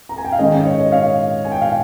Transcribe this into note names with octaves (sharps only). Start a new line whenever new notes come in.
A#5
G#5
G5
F5
G#2 D#3 G#3 C#4 D#5
D#5
C#5
D#5
C#5 F5
G#5
G5
F5